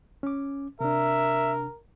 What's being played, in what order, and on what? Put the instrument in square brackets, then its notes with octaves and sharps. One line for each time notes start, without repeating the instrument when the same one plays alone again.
[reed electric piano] C#4 D6
[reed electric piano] C3 D4 [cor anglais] A#4 [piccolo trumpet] E5